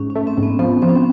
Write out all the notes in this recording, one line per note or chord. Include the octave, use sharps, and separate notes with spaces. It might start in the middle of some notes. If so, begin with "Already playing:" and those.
Already playing: G#2 C#4
C#4
A3
C4
G#2
B3
F3 B3
F3 C4
C#4
C4